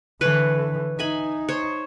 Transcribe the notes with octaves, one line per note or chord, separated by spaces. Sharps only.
D3 E3 B4 C#5
D#4 E5 G#5 B5
C5 C#5